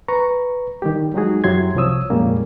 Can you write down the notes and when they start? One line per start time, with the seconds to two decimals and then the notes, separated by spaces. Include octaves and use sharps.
0.08 B4 A#5 C#6
0.82 D#3 G3 G4
1.14 F#3 G#3 D#4 F#4 G#4
1.44 F#2 F#3 E4 G4 C6 G#6
1.75 C2 C3 F3 C#5 D#6 E6
2.10 F2 A#2 G3 G#3 A#3 C#4